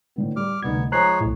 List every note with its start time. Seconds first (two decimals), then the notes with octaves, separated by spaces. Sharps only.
0.16 A2 D3 B3
0.36 G3 D6 F6
0.63 D2 C3 G3 B3 D#4 G#6
0.92 F3 G#3 C5 C#5 A#5 F#6 C7
1.21 B1 A2